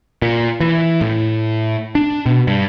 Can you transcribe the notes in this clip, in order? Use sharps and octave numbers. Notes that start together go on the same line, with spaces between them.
A#2
E3
A2
D4
B2
G2